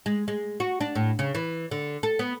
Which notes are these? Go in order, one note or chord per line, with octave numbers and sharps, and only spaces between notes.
G#3
G#3
F#4
D4
A2
C#3
E3
D3
A4
B3